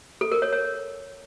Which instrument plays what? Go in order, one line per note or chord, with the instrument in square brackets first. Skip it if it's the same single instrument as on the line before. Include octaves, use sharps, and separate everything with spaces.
[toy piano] A4
A#4
C#5
C#5